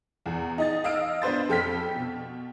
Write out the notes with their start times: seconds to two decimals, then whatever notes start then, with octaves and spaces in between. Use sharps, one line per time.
0.26 E2
0.58 D#4 D#5 A6
0.84 D#5 F5 E6 F6 D7
1.22 B3 D4 B4 C5 A6
1.49 F2 A4 G5 F6 B6
1.95 B2